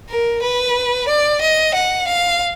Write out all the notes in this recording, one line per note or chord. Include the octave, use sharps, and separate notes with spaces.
A#4
B4
D5
D#5
F#5
F5